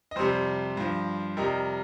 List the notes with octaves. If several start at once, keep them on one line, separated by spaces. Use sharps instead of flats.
D#5
F2 C3 G3 C5
G2 F3
F2 C3 G3 A#4 D#5